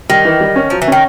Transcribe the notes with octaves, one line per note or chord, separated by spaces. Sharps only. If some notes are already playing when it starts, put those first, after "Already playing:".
D#3 G3
E3
G3
C#4
F3 F#3
E3
D#3 C#4